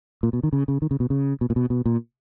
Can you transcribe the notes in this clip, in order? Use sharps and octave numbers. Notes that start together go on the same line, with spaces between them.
A#2
B2
D#3
C#3
C#3
D#3
C#3
B2
C#3
B2
A#2
B2
B2
A#2